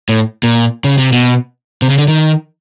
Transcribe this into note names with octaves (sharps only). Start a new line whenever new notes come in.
A2
A#2
C#3
C3
B2
C3
C#3
D3
D#3